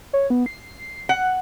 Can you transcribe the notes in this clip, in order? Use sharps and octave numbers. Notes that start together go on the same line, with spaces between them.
C#5
B3
C7
F#5